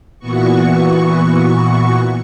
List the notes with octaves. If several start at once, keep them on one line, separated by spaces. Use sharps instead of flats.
A#2 E3 B3 F#4 C#6